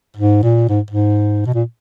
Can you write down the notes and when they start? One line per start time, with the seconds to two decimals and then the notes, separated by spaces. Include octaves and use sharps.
0.16 G#2
0.43 A#2
0.68 G#2
0.90 G#2
1.46 B2
1.54 A#2